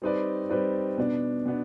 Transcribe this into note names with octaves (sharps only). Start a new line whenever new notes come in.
G3 C4 D#4 B4 D5
G3 C4 D#4 B4 D5
B2 B3 D4
B2 B3 D4